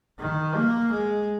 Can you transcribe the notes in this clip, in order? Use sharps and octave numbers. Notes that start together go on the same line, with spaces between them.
D#3
A#3
G#3